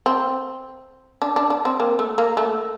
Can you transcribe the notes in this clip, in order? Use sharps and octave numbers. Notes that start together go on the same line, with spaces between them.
C4
D4
D4
D4
C4
A#3
A3
A#3
A3